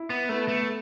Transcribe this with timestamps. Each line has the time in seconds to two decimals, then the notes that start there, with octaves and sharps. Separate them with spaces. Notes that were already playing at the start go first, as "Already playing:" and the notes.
Already playing: E4
0.10 B3
0.29 A3 B3
0.48 A3